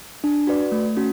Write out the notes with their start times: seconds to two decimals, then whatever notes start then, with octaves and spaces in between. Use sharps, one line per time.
0.24 D4
0.47 F#4 B4 D5
0.72 A3
0.97 C#4 F#4